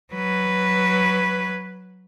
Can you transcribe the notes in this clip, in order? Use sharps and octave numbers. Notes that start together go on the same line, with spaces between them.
F#3 B4